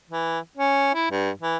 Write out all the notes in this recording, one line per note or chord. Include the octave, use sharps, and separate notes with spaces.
E3
C#4
E4
G2
E3